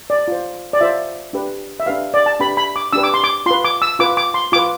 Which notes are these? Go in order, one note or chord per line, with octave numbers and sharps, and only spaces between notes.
D5
F4 C5
D5
F4 C5 E5
D4 G4 B4
E5
D4 G4 B4 F5
D5
A5
D4 G4 B4 B5
B5
D6
D4 G4 B4 E6
D6
C6
D6
F4 B4 C6
D6
E6
F4 B4 D6
D6
C6
F4 B4 D6